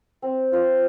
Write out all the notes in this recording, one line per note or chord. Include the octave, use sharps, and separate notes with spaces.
C4
F4 C5 F5